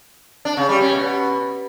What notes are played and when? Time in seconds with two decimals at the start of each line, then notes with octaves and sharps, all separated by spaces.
0.45 D4
0.57 C#3
0.69 G3
0.81 C#4
0.93 B2